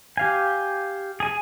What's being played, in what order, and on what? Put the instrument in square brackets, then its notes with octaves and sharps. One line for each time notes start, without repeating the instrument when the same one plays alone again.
[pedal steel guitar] G4 F5 G#5
G#4 G#5